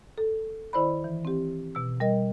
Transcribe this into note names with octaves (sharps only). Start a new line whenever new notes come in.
A4
D#3 E4 C5 D5 B5
E3
C4 G4
B2 E6
G3 A#4 D#5